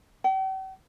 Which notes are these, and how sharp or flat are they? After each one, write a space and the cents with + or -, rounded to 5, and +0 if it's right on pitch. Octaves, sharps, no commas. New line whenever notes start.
G5 -45